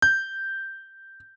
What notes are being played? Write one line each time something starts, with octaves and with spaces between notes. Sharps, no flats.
G6